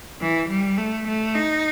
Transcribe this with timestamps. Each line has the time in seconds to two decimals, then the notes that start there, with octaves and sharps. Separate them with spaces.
0.21 E3
0.49 G3
0.78 A3
1.08 A3
1.35 D#4